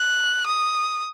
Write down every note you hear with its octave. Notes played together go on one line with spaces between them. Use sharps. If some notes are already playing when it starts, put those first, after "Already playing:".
Already playing: F#6
D#6